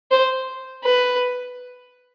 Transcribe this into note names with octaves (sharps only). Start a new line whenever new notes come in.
C5
B4